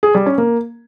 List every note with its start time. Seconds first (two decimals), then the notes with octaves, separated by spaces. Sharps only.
0.03 G#4
0.15 G3
0.26 C#4
0.38 A#3